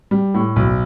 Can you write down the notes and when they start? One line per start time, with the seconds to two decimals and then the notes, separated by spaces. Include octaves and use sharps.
0.11 G3
0.34 A2
0.56 B1